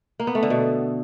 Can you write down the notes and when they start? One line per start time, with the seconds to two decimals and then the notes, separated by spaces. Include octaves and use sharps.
0.20 A#3
0.27 B3
0.35 A3
0.43 D3
0.50 B2